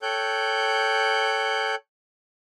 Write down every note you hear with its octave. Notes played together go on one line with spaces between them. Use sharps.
A4 C#5 G5 F#6 G6